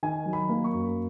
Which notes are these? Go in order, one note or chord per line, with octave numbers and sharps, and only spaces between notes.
D#3 G#5
F#3
B5
A#3
C#6
F#2